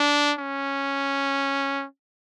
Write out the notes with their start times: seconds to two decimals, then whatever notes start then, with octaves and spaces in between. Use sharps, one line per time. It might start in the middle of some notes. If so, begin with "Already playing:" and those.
Already playing: D4
0.39 C#4